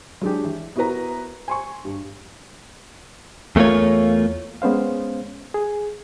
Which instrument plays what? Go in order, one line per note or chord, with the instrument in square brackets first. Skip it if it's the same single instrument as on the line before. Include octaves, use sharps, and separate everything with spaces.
[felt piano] F#3 G#3 D4 G4
E3
B3 E4 F#4 A#4 B4 A#5
G#5 C6 C#6
G2
[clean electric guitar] E2 A3 A#3 F4 C#5
[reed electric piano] G#3 B3 C#4 C5 F5
G#4